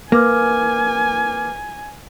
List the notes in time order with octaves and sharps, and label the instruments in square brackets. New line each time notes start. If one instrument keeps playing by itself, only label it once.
[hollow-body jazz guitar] A#3 [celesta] B4 D6 F6 [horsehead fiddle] G#5